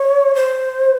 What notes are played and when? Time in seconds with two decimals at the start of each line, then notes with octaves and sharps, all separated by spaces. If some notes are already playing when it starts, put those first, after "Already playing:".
Already playing: C#5
0.35 C5